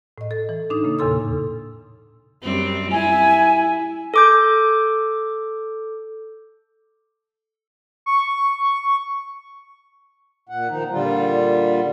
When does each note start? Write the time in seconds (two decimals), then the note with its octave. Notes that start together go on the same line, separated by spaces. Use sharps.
0.18 A2 D#5
0.31 A4
0.49 E3
0.70 A2 D4 D#4 D#6
0.83 C#3 A#3
0.99 E2 A#2 C#3 A4 C6 E6
2.43 F#2 G3 C4
2.92 E4 G#5
4.14 A4 D6 G6
8.06 C#6
10.49 A#2 F#5
10.68 D#3 F3 D#4
10.90 A#2 D3 G3 F4